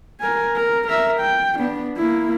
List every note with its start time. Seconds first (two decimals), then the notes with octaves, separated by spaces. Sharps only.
0.20 A#4 G#5
0.56 A#4
0.88 A#4 E5
1.21 G5
1.59 B3 D4
1.96 A#3 E4